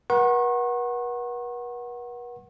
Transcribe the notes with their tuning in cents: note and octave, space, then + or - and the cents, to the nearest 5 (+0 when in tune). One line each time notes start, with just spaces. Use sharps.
B4 -45 F#5 +0 C#6 -40